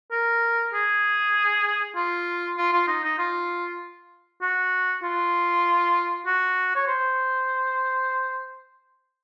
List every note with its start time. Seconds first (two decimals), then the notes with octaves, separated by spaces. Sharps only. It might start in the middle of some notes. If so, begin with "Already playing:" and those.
0.12 A#4
0.74 G#4
1.96 F4
2.58 F4
2.73 F4
2.88 D#4
3.04 D#4
3.19 F4
4.42 F#4
5.03 F4
6.26 F#4
6.75 C#5
6.87 C5